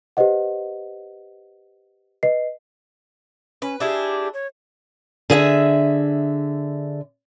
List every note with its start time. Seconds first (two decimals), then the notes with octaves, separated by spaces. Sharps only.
0.17 G4 B4 C5 D#5 F#5
2.23 B4 D#5 C7
3.62 C#4 B4
3.80 D4 E4 G4 G#4
4.34 C#5
5.30 D3 G#4 E5